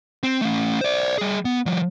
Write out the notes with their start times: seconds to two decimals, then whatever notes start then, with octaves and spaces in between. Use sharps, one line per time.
0.23 C4
0.42 A3 C#4
0.81 C5 D5
1.18 G3 G#4
1.45 B3
1.66 F3 G3